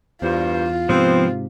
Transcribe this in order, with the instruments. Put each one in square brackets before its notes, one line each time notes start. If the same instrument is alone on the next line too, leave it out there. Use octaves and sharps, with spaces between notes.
[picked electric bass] E2 [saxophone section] G2 C5 [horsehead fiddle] F4
[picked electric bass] G#2 C3 [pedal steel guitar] F3 B3 [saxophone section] C4